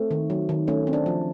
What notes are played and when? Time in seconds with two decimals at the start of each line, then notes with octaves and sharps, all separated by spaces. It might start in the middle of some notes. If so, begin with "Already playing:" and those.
Already playing: A3 C4
0.11 D#3
0.30 F#3
0.49 D#3
0.67 A3 C#4
0.87 C4
0.93 D4
1.06 F3